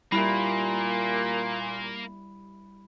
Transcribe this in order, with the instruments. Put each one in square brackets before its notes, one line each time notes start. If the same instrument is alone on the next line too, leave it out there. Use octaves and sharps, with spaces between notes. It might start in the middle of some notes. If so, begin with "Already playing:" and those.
[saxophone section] A#2 [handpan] G3 E4 [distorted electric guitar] A#3 [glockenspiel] B5